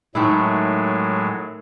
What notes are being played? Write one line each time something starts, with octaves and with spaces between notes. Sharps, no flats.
A2 D#3 F#3 G#3 A3 E4